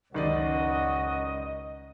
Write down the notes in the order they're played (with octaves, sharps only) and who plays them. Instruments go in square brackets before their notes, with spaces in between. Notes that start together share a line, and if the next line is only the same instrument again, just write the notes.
[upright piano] F#1 D#3 D5 [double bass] C#2 [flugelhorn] F#4 [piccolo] D#5